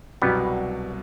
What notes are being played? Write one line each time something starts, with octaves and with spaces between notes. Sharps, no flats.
C2 B2 F#3 G3 B3